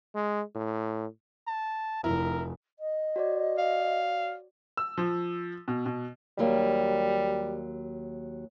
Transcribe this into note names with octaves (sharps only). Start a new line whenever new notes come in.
G#3
A2
A5
F1 E4 A#4
D#5
F#4 C#5 D5
F5
E6
F3
B2
B2
D#2 F#3 G3 A#3